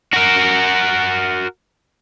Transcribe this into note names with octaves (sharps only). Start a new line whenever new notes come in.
F#4 A#4